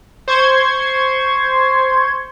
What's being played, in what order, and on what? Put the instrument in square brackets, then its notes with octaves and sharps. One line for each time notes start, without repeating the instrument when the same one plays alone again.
[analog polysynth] C5 C6 C#6 G#6